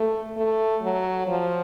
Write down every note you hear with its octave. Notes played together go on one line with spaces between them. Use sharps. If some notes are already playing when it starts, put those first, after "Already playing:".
Already playing: A3
A3
F#3
F3